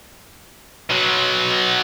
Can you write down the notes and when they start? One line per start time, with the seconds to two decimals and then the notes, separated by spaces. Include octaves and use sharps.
0.90 B2 F#3